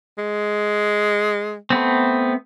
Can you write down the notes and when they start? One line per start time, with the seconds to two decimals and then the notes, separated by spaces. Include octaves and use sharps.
0.18 G#3
1.70 A3 B3 C4